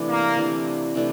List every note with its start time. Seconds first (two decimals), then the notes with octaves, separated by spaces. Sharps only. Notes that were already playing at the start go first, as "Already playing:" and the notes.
Already playing: C3 E3 A3 D4
0.09 A#3
0.37 C3 E3 A3 D4
0.95 C3 E3 A3 D4